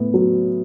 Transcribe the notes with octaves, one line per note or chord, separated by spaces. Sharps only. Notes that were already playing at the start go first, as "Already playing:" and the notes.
Already playing: A2 B3
F#3